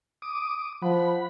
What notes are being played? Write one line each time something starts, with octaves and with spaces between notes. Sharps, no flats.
D6 D#6
F3 F#5 B5